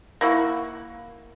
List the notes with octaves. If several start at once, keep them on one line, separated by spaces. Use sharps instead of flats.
A#3 E4 F#4